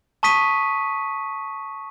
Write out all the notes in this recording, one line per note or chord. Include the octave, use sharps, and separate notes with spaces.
A5 C#6 D#6 B6 D#7